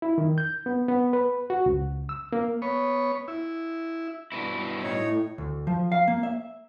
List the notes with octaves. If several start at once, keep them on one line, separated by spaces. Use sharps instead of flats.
E4
D#3
G6
B3
B3
B4
F#4
C#2
E6
A#3
B3 C#5
E4
G2 B2 E4
A2 D#4 C#5
D2
F3
F5
A#3
E5